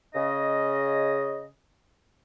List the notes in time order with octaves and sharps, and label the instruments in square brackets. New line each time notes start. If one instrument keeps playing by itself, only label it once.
[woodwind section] C#3 D#5